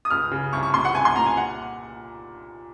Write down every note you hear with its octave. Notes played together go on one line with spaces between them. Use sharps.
D#6
C#2 F6
C#3
C2 C#6
C#6
A#2 C6
F#5
C2 G#5
C6
A#2 A#5
G#5
F#5